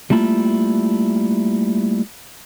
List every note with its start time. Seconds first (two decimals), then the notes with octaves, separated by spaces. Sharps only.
0.10 G3 A3 A#3 E4 F4